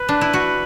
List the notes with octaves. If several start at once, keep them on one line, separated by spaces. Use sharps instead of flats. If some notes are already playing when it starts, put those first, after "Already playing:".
Already playing: B4
D4
E4
F#4